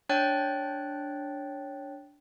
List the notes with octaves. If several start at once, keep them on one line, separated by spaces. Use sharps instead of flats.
D4 C#5 G5 F#6 A6